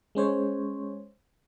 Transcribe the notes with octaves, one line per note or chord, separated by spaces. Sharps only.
G#3 C#4 C5 C#5